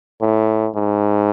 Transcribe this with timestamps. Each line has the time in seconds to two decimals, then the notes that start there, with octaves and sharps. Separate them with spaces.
0.21 A2
0.75 G#2